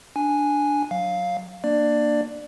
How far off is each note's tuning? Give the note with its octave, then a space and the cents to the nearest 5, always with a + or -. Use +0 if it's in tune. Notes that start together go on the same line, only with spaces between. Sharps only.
D4 +0 G#5 +0
F#3 -10 F5 +0
A#3 +0 D4 +20 D5 +15